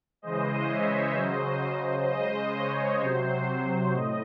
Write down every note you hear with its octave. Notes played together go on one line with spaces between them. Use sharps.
C#3 E3 G#3 C5 D#5
C#5 E5
C#3 F#3 C5 D#5
C#3 G#3 C5 D#5
C#5
C3 F#3 C5
A2 D#5